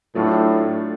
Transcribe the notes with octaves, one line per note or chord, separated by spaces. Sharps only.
A2 F#3 A3 D4 F4 A4